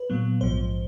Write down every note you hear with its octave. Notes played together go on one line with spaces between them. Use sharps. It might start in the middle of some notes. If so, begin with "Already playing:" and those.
Already playing: B4
A#2 F#3 B3
A#1 G#2 F3 C5